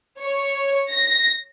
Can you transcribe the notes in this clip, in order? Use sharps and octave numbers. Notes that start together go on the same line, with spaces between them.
C#5
A#6